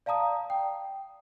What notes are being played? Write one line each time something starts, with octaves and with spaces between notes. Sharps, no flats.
D5 F5 A5 A#5 D#6
G5